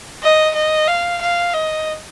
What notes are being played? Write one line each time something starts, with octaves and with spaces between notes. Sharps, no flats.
D#5
D#5
F5
F5
D#5